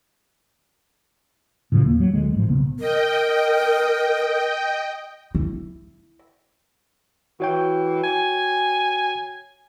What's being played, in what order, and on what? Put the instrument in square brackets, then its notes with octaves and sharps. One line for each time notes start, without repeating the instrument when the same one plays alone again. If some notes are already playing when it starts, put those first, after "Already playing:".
[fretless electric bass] A2 C#3 F3
D#2 A#3
F#3
D2 G#3
G#1 A2 F3
B1 C#3 B3
[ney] A#4 [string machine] D#5 G5
[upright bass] E4
[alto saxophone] E3 [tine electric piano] F#4 C#5 G5
[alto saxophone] G#5